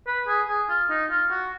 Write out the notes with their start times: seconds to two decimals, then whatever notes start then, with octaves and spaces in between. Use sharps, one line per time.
0.07 B4
0.28 G#4
0.48 G#4
0.69 F4
0.90 D#4
1.10 F4
1.30 F#4